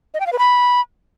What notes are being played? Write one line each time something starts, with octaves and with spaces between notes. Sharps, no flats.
D#5
G5
F5
B4
B5